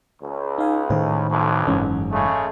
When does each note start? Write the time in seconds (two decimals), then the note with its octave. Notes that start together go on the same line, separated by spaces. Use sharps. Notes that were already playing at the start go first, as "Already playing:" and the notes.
0.21 C#2
0.58 D#4 F5 G#5
0.90 A2 D#3 A3 C5
1.30 B1 F2
1.67 F#1 G#2 E3 C#4
2.11 C#3 G#3 A3